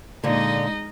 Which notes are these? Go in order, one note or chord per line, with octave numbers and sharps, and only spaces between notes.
A#2 D3 G#3 D#4 D#5